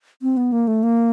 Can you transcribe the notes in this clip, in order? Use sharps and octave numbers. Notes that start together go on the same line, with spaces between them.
C4
B3
A#3
A3
A#3